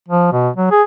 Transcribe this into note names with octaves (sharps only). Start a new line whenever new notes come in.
F3
B2
F#3
G#4